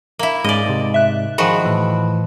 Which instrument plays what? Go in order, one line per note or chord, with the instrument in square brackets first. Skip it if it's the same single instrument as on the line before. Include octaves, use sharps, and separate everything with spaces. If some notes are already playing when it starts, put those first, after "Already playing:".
[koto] A#3 E4
[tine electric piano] G#2 G#3 C#4 [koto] D5 D#5
[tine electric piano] G#2 C3
[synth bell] E5 F#6
[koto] D#3 F3 F#4 [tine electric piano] G#4 [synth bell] B5
[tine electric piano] A2 E3